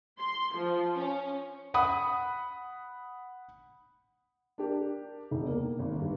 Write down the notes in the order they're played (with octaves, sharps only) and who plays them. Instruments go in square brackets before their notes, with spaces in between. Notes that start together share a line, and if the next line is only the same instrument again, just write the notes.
[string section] C6
F3
C#4
[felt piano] F#5 B5 D#6
D4 G4 A#4
E1
A#3
G#1
G#1 G2